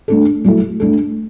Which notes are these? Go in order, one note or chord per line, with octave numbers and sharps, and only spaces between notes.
A3 D4 A4
F#3 A3 E4 A4
A3 D4 A4